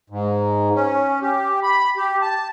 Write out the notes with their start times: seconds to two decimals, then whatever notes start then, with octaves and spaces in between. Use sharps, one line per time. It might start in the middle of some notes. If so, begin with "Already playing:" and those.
0.10 G#2
0.75 C#4
1.22 G4
1.63 B5
1.97 G4
2.22 A5